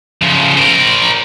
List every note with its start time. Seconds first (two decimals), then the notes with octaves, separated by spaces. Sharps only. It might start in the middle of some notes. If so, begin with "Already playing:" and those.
0.22 C#3 F3
0.58 A#4 C5